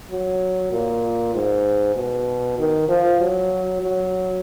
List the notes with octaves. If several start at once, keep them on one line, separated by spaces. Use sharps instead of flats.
F#3
A#2
G#2
B2
D#3
F3
F#3
F#3